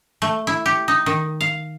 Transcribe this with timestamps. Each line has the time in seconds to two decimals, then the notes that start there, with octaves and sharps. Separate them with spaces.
0.22 A3
0.47 E4
0.66 G4
0.88 D#4
1.06 D#3
1.41 F5